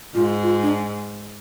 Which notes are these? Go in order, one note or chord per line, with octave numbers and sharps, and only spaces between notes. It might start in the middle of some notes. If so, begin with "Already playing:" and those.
G#2 F4
F4
D4